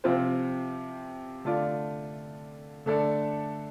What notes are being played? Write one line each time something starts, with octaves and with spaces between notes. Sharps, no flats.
C3 F3 C4 F4 C5
D3 A3 F4 D5
D3 A3 D4 A4 D5